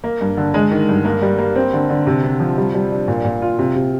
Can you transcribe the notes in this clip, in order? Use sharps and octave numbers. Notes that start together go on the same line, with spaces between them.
A#3
G2
D3
G#3
D#3
G2
A#3
G3
A#3
C4
D3
D3
C3
C3
F3
G3
G3
D4
A#2
A#2
F4
C3
C3